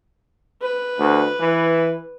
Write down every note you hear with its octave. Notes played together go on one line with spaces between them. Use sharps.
B4
D2
E3